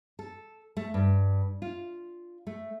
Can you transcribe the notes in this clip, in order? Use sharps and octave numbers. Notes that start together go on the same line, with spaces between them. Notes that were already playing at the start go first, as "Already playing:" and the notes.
A4
A3
G2
F4
A3